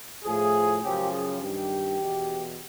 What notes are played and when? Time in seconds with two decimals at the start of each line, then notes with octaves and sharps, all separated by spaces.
0.24 A2 F3 G#4
0.82 F#2 C#3 F3 G4
1.11 G#4
1.41 G2 D#3 G4
2.00 E2 B2